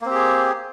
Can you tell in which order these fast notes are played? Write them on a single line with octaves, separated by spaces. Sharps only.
A#3 C4 G4 G#4